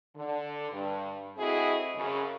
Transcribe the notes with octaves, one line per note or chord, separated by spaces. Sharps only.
D3
G2
A3 C4 E4 F#4 G#4 D#5
F#2 C#3